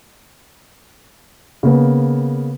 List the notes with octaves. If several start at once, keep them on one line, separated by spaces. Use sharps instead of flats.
C#3 A#3 B3